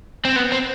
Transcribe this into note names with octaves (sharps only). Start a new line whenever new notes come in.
C4
B3
C4